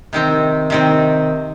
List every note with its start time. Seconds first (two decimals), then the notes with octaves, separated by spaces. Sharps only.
0.13 C3 D#3 C4
0.70 C3 D#3 C4